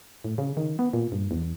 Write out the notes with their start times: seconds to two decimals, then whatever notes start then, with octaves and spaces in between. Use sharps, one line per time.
0.24 A2
0.38 C#3
0.57 D#3
0.79 B3
0.93 A#2
1.12 G2
1.31 E2